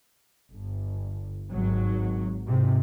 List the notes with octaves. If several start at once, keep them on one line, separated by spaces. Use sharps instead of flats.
G1
G#1 F#3
G#2 C3